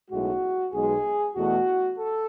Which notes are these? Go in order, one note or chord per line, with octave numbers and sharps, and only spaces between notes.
B1 A2 G#3 F#4
B1 B2 G#3 G#4
E2 B2 A3 F#4
A4